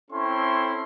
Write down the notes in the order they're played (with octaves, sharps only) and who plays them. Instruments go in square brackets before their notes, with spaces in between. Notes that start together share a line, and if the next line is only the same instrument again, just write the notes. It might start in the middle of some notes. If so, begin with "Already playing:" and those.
[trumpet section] C4 C#4 E4 A4 C6 C#6